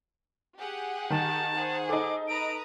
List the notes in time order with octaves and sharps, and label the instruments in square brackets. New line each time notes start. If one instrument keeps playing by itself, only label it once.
[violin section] G4 G#4 F#5
[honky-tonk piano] D#3 [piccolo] A5
[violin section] G#4 C5 F#5
[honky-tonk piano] D#4 A4 [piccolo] D6
[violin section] B4 A#5 D#6 [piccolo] D7